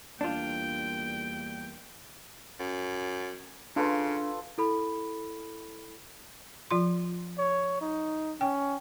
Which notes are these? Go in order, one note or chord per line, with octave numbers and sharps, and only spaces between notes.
E2 G3 A#3 D4 F4 G5
F#2
C#3 D4 F4 A4 B4
E4 A4 B5
F3 F4 C6
C#5
D#4
C#4 G5